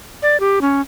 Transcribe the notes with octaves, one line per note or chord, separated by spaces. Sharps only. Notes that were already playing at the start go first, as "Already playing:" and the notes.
D5
G4
C#4